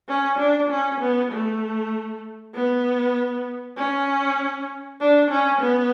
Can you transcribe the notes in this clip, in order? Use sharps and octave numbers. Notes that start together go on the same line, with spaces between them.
C#4
D4
C#4
B3
A3
B3
C#4
D4
C#4
B3